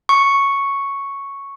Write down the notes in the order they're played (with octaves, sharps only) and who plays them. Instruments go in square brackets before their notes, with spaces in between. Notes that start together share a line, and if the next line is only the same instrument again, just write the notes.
[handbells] C#6